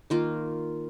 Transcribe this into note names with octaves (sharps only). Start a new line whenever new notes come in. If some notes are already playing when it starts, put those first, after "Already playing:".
D#3 A#3 F4